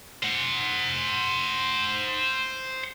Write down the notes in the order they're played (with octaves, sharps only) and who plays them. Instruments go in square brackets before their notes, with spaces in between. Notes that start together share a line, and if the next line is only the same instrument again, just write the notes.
[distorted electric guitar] C5 F#5